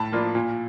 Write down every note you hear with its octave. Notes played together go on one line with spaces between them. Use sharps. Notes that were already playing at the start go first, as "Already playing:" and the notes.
Already playing: A2 A5 B5
F3 A#3 D4 F4
A#2